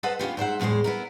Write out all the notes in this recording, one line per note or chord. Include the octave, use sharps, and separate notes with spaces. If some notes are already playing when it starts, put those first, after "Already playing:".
A4 B4 C5 D#5 F#5
B3 C#4 F4 G4
G#2 C5 E5 F#5
E2 A2 F3 G#3 C5
B3 E4 A#4